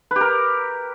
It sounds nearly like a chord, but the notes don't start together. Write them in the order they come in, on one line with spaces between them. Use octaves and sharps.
B4 G4 A#4